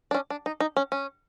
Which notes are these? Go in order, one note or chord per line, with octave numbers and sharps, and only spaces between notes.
D4
C#4
D4
D#4
D#4
C#4
C#4